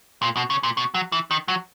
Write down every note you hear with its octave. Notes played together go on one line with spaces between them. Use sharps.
A#2
B2
C#3
A#2
B2
F#3
E3
D#3
F#3